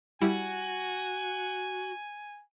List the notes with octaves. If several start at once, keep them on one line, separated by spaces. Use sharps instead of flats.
G3 E4 F#4 G#5